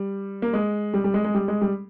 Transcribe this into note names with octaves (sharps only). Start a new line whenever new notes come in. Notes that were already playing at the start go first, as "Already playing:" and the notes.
Already playing: G3
A#3
G#3
G3
G3
G#3
G#3
G3
G#3
G3